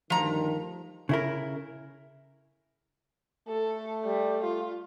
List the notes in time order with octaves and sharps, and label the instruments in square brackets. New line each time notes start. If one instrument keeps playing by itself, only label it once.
[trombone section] D2 G2 D#3 [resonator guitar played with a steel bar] F3 A#5
[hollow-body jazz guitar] C#3 E4 A#4
[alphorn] A3 [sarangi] A4
[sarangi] G3
F4